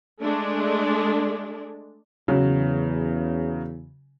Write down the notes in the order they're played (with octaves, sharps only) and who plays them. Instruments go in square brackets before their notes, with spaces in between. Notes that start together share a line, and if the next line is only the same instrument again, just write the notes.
[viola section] G#3 A3 D4
[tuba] E2 [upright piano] C#3 F#3